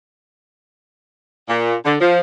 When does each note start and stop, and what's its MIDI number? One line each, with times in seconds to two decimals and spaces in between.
1.48 1.75 46
1.85 1.95 50
2.00 2.21 53